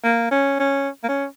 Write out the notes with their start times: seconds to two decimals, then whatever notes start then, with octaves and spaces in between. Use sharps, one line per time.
0.04 A#3
0.31 C#4
0.59 C#4
1.04 A#3
1.08 C#4